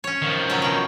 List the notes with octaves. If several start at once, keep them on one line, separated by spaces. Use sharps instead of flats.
C#4 C#5
D#3 F3
F#3 C#4
B2 G5